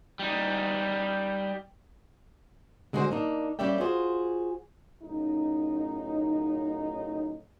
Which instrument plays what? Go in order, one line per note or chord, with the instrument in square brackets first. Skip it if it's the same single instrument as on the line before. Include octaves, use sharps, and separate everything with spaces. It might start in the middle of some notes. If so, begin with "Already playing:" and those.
[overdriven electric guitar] G3 D#4
[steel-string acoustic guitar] D3 G#3 E4 F#4 G#4 C5
A#3 D4 D#4
G3 A#3 C#4 D5 E5 G5
F4 F#4 G#4 C5
[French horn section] F#2 A2 C#3 D#4